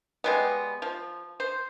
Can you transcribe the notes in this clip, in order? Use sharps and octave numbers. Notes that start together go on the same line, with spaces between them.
G3 G#3 B3
F3
C5